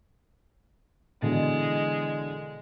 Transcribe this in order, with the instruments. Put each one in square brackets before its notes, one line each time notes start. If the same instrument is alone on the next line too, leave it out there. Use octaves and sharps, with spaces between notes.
[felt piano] B2 D3 E3 [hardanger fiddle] G#3